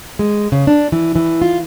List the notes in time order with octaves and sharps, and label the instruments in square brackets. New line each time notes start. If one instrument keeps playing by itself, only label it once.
[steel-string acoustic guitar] G#3
C#3
D4
E3
E3
F4